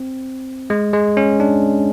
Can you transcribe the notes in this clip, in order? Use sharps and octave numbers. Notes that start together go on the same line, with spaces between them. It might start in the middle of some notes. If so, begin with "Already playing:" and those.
Already playing: C4
G#3
G#3
C#4
D4